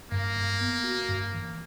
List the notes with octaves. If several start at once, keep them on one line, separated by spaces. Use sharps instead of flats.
G2 A#3
G2
B3
F#4
G2
E3